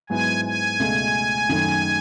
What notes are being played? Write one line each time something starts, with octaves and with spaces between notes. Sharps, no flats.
G#2 F#3 B3 E4 G#5
G#5
C#2 B2 A3
F#2 D#3 A3 D#4